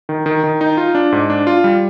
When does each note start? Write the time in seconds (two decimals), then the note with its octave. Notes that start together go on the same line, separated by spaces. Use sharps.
0.09 D#3
0.26 D#3
0.44 D#3
0.61 D#4
0.77 F4
0.95 D4
1.12 G#2
1.30 D4
1.47 F4
1.64 G3